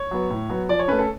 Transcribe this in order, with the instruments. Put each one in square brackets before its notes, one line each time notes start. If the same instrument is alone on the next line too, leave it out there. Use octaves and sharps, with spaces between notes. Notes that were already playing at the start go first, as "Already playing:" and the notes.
Already playing: [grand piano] C#5
F#3 B3
A2
F#3 B3
F3 D5
C#5
A3 C#4 B4
A4